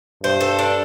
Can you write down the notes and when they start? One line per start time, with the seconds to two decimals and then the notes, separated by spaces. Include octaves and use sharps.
0.23 G2 C5
0.41 A4
0.59 D4